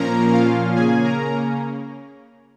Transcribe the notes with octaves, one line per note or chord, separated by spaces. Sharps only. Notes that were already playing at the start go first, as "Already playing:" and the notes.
Already playing: A#2 F3 A#3 C#4 A#4 A#5
F4 F5
C#3 A#3 C#4 G#4 G#5
A#4 A#5